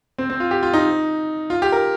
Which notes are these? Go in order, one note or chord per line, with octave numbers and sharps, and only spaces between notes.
C4
C4
F4
G4
F4
D#4
F4
G4
A#4